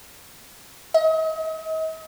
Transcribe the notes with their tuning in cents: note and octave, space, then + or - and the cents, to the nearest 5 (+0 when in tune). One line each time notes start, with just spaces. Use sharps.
D#5 +40